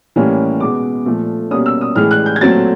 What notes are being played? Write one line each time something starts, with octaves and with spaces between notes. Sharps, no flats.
A2 E3 G3 A#3 C#4
B2 G#3 B3 D6
A#2 F3 A3
B2 G3 A#3 C#4 D#6
E6
D#6
A2 E3 G#3 F6
F#6
G6
G#6
A#2 F#3 A3 C4 A6